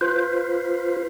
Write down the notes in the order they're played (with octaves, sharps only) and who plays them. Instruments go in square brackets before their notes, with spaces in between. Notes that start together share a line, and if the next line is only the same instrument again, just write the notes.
[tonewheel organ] F4 B4 C5